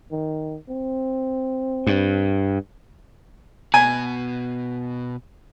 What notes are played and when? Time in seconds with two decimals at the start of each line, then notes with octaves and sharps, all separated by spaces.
0.11 D#3
0.69 C4
1.87 G2
3.74 B2 G#5